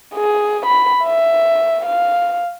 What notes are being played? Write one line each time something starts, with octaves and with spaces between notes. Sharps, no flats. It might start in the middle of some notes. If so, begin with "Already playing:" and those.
G#4
B5
E5
F5